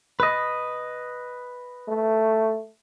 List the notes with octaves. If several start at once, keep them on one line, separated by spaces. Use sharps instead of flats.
B4 D#5
A3